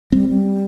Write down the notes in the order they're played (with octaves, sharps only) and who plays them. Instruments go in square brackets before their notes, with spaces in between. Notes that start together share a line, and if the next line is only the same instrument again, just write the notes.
[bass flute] G3 [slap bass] C4
[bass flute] G3